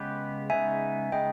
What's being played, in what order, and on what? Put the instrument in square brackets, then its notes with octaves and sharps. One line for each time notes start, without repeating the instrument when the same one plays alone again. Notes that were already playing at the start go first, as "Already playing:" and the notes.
Already playing: [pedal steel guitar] C#3 G#3 B3 G4 B4
[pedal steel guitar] C#3 G#3 B3 D#4 [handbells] E5 G#5
[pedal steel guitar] C#3 G#3 B3 D#4 [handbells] D#5 G5